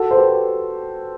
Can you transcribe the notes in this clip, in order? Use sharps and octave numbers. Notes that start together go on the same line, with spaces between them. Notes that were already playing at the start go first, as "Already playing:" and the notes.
Already playing: F#4 A4
C5
G4 B4